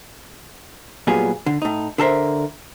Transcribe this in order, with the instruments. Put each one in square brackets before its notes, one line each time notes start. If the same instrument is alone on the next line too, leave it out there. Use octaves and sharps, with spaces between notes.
[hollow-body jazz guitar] A#2 F#3 G3 B3 F4 G#4
D3
A2 D#4
D3 A4 A#4 C5 E5